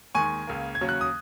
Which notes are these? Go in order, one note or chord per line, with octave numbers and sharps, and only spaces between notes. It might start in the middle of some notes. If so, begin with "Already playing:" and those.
D#2 D#3 G#3 G#5 C#6
C#2 C#3 A#3
G#6
D#2 C#3 F#3 C#4
F#6
D#6